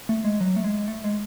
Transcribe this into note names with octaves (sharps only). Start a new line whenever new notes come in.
A3
G#3
F#3
A3
G#3
A3
G#3